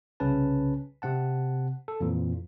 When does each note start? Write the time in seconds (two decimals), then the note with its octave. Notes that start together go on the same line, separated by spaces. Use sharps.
0.20 C2 C#3 C#4 B4 A5
1.02 C3 C4 F#5 A5
1.88 A4
2.01 F2 A#2 E3 F3